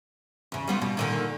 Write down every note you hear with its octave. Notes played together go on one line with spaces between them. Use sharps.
E2 C#3
G3 B3 F4
B2 G3
A#2 D3 D#3